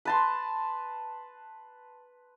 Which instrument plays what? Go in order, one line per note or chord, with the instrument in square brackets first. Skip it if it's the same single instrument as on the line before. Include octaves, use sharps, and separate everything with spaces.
[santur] B4 A5 C6